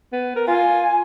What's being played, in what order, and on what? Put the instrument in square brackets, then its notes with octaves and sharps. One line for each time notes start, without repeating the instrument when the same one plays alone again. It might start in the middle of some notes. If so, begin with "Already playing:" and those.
[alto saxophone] B3
A#4
[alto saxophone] F4 [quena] G#5